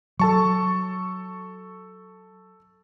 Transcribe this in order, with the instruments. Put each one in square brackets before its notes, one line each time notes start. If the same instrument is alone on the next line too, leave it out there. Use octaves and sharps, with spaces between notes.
[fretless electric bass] F#3 [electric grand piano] A4 A5 C#6